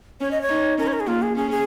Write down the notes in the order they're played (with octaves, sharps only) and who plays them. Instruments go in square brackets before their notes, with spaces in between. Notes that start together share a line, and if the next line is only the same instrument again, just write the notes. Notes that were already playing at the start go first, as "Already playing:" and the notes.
[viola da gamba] C#4 [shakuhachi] C#5
[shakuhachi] D#5
C#5
[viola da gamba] D#4
[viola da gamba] C#4 [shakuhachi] A#4
[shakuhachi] C#5
A#4
G#4
[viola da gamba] A#3 [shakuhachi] F4
[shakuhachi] G#4
[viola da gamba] C#4 [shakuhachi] G#4
[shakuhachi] G#4